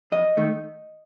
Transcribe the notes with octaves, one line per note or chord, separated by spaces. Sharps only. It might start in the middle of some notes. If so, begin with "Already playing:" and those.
F2 D#5
D#3 A3